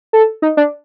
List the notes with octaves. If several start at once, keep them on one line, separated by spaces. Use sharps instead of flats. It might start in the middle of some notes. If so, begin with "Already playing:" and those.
A4
D#4
D4